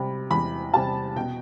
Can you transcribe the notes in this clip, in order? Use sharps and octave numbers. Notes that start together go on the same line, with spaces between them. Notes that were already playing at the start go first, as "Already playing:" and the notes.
Already playing: C3 G3 B5
E2 B5
C3 G3 A5
B2 G5